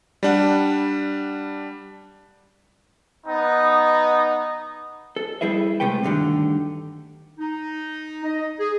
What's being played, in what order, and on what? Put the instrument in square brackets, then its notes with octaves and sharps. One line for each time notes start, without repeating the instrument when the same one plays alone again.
[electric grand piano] G3 D4 F#5
[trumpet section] B3 D#4
[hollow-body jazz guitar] A4
G3 E4 G#4 B4 E5
C3 G#3 A3 B4 G5
D2 G2 D3 D#3
[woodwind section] D#4
D#5
G#4